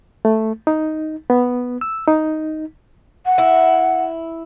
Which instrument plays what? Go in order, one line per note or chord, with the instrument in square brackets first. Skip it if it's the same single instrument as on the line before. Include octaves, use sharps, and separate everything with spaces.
[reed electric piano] A3
D#4
B3
E6
D#4
[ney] F#5
[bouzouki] E4